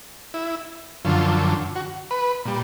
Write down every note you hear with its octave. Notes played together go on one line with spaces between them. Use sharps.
E4
F#2 D3 F3 F4
F#4
B4
A#2 G3